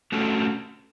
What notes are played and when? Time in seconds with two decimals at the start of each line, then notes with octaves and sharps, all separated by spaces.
0.12 A3 C#4 F#4 A4